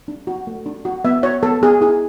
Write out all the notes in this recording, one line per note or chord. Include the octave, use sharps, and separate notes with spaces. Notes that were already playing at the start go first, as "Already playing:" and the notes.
D4
F#4
A3
D4
F#4
B3 E5
F#4 C#5
B3 A4
B3 G#4
E4 G#4